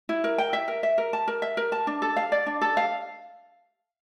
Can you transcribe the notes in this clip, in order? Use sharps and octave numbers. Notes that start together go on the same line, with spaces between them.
E4
A#4
G5
E5
A#4
E5
A#4
A5
A#4
E5
A#4
A5
D4
A4
F5
D5
D4
A4
F5